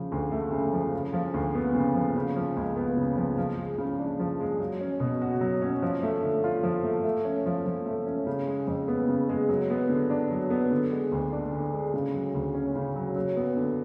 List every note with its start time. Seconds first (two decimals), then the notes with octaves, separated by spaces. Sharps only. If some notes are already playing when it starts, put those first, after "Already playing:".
Already playing: C#3 F3
0.12 D2
0.32 A3
0.52 C#3
0.73 F3
0.93 C#3
1.13 F3
1.34 D2
1.54 B3
1.75 C#3
1.95 F3
2.16 C#3
2.36 F3
2.57 C#2
2.76 B3
2.97 C#3
3.17 F3
3.38 F3
3.58 G#3
3.78 C#3
3.99 D4
4.19 F3
4.40 G#3
4.60 F#3
4.81 C#4
5.00 B2
5.22 F#4
5.41 F#3
5.62 C#4
5.82 F3
6.03 A3
6.23 D3
6.44 F4
6.63 F3
6.84 A3
7.04 A3
7.25 C#4
7.46 F3
7.66 F3
7.86 A3
8.06 C#4
8.27 C#3
8.47 G#3
8.67 F2
8.88 B3
9.09 C#3
9.29 G#3
9.49 F#3
9.70 B3
9.89 D3
10.10 D4
10.30 F#3
10.50 B3
10.71 D3
10.92 G#3
11.12 D2
11.32 D4
11.53 D3
11.74 G#3
11.94 C#3
12.13 F#3
12.35 D2
12.54 C#4
12.75 C#3
12.96 F#3
13.16 F#3
13.36 B3
13.57 D3